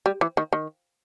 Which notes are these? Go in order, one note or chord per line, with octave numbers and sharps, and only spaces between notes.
G3
E3
D#3
D#3